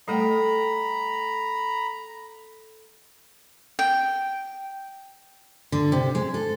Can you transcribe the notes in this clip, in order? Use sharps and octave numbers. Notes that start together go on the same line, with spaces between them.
G3 A3 A4 D#5 G5 A#5 B5
G5
D3
C3
G#3
A4